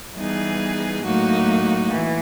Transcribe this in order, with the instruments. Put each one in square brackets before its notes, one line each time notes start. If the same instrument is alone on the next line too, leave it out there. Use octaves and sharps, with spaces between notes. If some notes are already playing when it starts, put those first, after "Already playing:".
[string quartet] E3 G3 B3 D#4 G#4
A2 F#3 A#3 D#4 F#4
E3